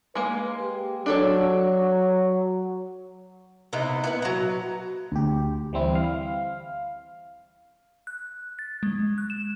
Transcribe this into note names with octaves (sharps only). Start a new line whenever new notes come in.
G#3 A#3 B4
G4
F#3 D4 A4 C#5
C3 B3 D#4 E4
B3 E4 B4
F#3 A#5
D2 G4
E3 G3 C4 E4
F5
F#6
A6
G#3
F#6
E7